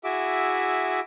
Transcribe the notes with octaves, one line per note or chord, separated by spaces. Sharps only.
E4 F#4 G#4 E5 D6